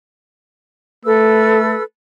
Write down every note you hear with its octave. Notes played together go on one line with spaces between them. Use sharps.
A3 A4 B4 E6